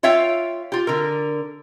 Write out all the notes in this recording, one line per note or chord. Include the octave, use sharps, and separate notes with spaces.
F4 C#5 E5 F5 G5
F4 G4
D3 A#4